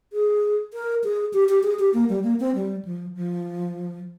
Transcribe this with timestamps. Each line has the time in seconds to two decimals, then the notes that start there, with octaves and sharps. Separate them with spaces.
0.13 G#4
0.74 A#4
1.04 G#4
1.33 G4
1.49 G4
1.63 G#4
1.79 G4
1.94 A#3
2.09 G3
2.24 A#3
2.40 C4
2.55 G3
2.85 F3
3.15 F3